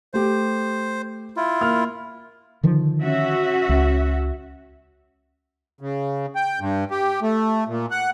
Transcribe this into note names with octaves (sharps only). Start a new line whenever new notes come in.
A3 G4 C5
E4 F4
A#3 F6
D3 D#3 F3
C#4 F#4 E5
C#2
C#3
G5
G2
G4
A3
A#2
F#5